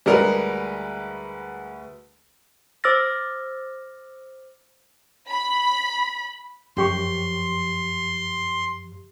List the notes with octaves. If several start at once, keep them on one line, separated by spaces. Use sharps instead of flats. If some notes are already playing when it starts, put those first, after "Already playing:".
D2 G3 G#3 F#4 A#4 B4
C5 D6 E6 F6 A6 A#6
B5
F#2 F3 G4 C6 C#6